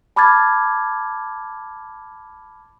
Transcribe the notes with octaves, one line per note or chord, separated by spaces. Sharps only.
A5 B5 D6 F6 G#6 A6